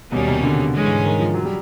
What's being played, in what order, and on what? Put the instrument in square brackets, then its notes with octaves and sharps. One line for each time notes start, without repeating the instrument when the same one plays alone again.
[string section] D#2 D#3 G3 A#3 C#4 [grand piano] B2
[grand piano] C3
D3
[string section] G#2 E3 G#3 C#4
[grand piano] D#3
F3
F#3
G3